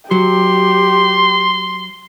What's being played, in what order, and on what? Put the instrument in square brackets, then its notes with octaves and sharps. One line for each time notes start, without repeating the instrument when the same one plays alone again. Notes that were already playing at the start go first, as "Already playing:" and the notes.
[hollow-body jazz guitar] F#3 [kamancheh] G4 [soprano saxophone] C6